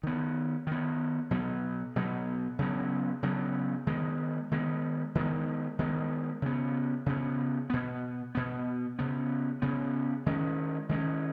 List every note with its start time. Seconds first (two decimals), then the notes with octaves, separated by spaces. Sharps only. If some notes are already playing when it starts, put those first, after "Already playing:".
0.03 D#3 B3
0.67 D#3 B3
1.31 B2 F#3 B3
1.96 B2 F#3 B3
2.59 C#3 F#3 B3
3.23 C#3 F#3 B3
3.87 D#3 G#3 B3
4.51 D#3 G#3 B3
5.15 D#3 G#3 B3
5.79 D#3 G#3 B3
6.42 C#3 B3
7.06 C#3 B3
7.70 B2 B3
8.35 B2 B3
8.99 C#3 B3
9.62 C#3 B3
10.26 D#3 G#3 C#4
10.89 D#3 G#3 C#4